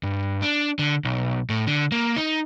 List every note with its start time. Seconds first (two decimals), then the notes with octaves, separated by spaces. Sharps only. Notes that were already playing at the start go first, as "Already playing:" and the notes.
0.03 G2
0.42 D4
0.79 D3
1.05 B1
1.50 A2
1.67 D3
1.92 A#3
2.16 D#4